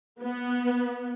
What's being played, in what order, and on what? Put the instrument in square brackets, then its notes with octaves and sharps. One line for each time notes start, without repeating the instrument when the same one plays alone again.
[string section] B3